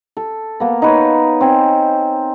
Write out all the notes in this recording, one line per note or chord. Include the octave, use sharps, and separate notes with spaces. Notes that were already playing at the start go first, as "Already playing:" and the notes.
A4
A#3 B3
D#4 B4 C#5
C4 G#5